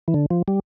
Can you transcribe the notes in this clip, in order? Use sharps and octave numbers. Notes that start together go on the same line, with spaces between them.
E3
D3
F3
G3